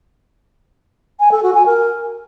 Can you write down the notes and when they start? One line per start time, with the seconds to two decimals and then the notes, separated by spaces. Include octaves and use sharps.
1.20 G#5
1.31 A4
1.43 F#4
1.54 G#5
1.66 A#4